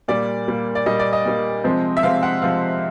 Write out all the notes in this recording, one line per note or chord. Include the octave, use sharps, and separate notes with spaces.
A#2 G3 A#3 D5
A#2 G3 A#3
D5
A#2 G3 A#3 D#5
D5
D#5
A#2 G3 A#3
C3 F3 G#3 C4
E5
C3 F3 G#3 C4 F5
F#5
C3 F3 G#3 C4 F5